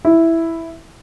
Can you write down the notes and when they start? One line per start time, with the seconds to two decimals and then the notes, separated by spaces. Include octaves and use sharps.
0.05 E4